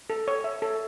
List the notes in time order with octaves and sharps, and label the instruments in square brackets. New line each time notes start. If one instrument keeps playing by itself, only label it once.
[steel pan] A4
C#5
E5
A4